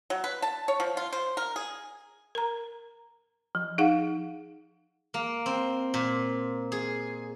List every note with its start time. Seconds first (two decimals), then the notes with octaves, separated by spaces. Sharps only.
0.10 F#3
0.24 B4
0.42 A5
0.68 C#5
0.80 F3
0.97 F4
1.13 C5
1.37 A#4
1.56 G#4
2.35 A#4 A#5
3.55 F3
3.78 D#4 G#4 F5 F#5
5.14 A#3
5.46 C4
5.94 A#2
6.72 G#4